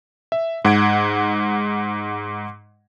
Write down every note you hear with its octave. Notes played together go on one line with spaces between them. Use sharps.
E5
G#2 F#5 G#6 D7